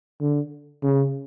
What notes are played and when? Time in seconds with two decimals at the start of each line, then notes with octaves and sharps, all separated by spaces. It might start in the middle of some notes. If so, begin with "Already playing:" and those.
0.20 D3
0.83 C#3